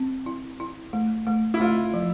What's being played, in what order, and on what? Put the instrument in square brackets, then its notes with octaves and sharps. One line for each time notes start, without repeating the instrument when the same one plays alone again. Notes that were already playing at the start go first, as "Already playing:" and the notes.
Already playing: [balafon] C4
E4
E4
A3
A3
[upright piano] E4
[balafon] A3 [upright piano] F4
[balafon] F3